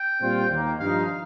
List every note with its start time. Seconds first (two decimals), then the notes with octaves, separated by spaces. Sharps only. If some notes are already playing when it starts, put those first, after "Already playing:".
Already playing: G5
0.21 A#2 G3 C4 F4
0.50 D#2 D#3 A#3
0.80 G2 F3 D#4 F5